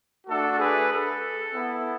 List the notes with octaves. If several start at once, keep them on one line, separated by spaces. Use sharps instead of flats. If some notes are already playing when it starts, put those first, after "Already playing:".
A3 D4 F#4 A4
G#4 B4
A4
B3 E4